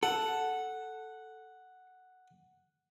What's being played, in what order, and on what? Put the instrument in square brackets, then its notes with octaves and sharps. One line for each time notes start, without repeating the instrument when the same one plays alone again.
[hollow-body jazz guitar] A4 [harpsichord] F#5